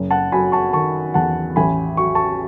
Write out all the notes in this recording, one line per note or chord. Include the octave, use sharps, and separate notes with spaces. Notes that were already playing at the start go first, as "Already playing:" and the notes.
Already playing: F#1
F#5 A5
F#3 G#5 B5
A5 C#6
D#3 A5 C#6
E2 F#5 A5
A1 G#5 B5
F#3 C#6
A5 C#6